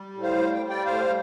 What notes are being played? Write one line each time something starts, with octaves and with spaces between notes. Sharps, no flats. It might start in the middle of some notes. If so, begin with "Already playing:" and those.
Already playing: G3
A2
C5 F5
G3
G5
G3
D5 G5
A2 C5 F5